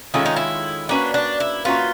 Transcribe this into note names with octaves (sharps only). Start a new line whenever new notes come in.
D#3 G#3 C#4 E4 F4 A4
D#4
E4
A#3 C#4 D4 F#4 B4
D4
E4
A#3 C#4 F4 F#4 B4